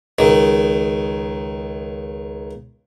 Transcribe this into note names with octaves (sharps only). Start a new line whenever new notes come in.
C#2 D#3